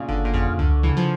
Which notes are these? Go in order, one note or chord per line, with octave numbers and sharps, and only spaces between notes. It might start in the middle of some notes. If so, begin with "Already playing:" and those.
Already playing: A#2 C#3
G1 D3
A#2
F2 C#3
C#2 D3
C#3 E3
F3